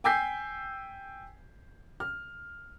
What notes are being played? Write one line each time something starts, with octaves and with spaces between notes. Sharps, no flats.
G5 G#5 E6 G6 B6 C7
F6